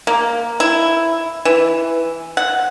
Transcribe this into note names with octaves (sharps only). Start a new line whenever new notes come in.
A#3
E4
E3
F#5